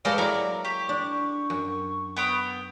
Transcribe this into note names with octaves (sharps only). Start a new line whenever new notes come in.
G3 G#3 A#3 C#4 A4 B4 F6
F#3 E4 A#4 D5 A#5
G4 C#6
D4
F#2
B3 G5 D#6